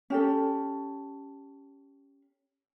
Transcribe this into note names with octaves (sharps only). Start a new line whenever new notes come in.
C#4 G4 A4